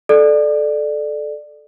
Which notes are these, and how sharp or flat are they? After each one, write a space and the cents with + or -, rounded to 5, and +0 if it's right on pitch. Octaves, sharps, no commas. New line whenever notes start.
A4 -15 D5 +20